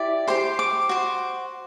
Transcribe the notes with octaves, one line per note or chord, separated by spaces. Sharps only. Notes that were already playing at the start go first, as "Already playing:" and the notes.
Already playing: E4 G4 D5
G4 C5 C6
D6
F#4 C5